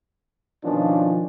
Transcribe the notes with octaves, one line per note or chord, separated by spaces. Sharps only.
B2 D#3 F3 C#4 D4 F4